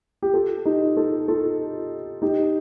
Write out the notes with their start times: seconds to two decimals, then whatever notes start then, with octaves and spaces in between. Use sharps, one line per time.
0.22 G4
0.33 F4 A4
0.65 D#4 G4
0.96 F4 A4
1.28 F4 A4
2.22 D#4 G4